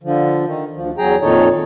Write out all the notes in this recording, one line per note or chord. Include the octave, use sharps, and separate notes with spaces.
D3 F3
D#3
D2 F3
E2 F#3 G#4 G5 A#5
F2 A#2 D#3 D#4 A4 C#5